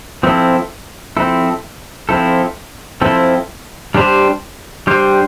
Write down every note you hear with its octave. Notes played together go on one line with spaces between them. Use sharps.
F3 C4 E4 A4
F3 C4 E4 A4
F3 C4 E4 A4
F3 C4 E4 A4
G3 D4 G4 C5
G3 D4 G4 C5